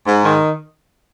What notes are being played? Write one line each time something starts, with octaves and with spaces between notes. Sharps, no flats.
G#2
D#3